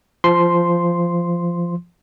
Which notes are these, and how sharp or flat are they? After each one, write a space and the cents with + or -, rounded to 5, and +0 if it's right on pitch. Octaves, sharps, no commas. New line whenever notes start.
F3 -15 C6 +0